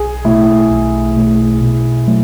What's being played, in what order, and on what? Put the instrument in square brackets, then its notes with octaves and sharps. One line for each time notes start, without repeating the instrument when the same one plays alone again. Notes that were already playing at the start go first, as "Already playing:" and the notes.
Already playing: [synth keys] B1 [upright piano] G#4
[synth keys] B2 A3 [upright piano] E4
[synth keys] B1
B2 A3
B2
F#3 A3